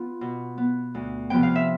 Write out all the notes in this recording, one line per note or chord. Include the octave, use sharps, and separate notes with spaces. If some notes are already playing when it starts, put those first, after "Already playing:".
Already playing: B3 F4
B2
B3
D2
C3 F3 B3 G5
F5
E5